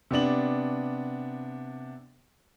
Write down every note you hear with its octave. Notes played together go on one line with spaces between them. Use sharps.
C3 B3 D4 F#7